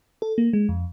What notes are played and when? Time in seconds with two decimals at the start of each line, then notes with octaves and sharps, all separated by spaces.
0.22 A4
0.38 A#3
0.53 G#3
0.69 F2